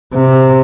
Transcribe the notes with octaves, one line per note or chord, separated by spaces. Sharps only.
C3